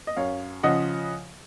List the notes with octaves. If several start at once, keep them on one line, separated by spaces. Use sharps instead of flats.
D#5
F#2 C#5 F5
C#3 F3 D#5 F#5